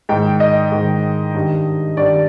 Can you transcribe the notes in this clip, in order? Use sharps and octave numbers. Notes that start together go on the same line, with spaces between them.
G#2 D#3 G5
D#5
G#2 D#3
G2 D#3
G2 D#3 D5